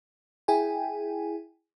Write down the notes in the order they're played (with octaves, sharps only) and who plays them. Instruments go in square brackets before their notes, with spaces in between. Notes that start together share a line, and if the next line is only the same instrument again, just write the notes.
[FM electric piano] E4 G#4 G5 G#5